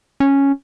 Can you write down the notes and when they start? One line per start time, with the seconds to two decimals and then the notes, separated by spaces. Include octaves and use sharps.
0.20 C#4